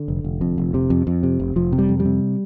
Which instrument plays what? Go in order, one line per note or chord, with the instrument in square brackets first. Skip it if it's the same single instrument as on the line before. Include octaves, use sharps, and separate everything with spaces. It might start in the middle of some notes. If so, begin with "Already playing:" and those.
Already playing: [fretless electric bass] D3
F1
F1
F2
F1
C3
F2
F2
C3
F1
F1 F3
C3
G3
F2
G3
C3